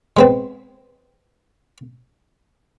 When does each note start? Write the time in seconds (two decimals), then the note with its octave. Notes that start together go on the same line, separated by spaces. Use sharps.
0.17 G#3 B3 C4